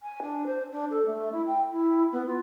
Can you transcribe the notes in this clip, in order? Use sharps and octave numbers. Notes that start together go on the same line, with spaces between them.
G#5
D4
C5
D4
A4
A3
E4
G5
E4
B3
F4